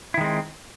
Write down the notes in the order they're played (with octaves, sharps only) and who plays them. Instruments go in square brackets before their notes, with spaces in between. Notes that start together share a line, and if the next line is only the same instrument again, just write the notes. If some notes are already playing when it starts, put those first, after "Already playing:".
[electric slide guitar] E4
D#3
G#3
C4